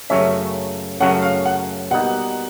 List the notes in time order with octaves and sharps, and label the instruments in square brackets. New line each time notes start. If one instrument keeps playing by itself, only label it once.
[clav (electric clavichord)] F#2 C#3 F#3 A3 C#4 [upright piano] E5
[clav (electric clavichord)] F#2 C#3 F#3 A3 C#4 [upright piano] F#5
[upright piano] F5
F#5
[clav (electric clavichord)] B2 G3 A#3 D#4 [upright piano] F#5